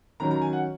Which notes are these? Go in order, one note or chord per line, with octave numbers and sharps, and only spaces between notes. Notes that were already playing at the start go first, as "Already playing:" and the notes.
D#3 F#3 C#4 A#5
A#5
G#5
F#5